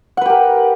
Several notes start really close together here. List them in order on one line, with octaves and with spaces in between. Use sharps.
F#5 B4 G4 A#4